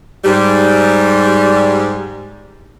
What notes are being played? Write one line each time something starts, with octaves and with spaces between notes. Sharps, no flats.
G#2 G3